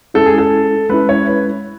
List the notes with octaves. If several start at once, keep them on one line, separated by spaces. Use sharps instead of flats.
G#3 C#4 E4 A4
G#4
A4
G#3 C#4 E4 B4
C#5
B4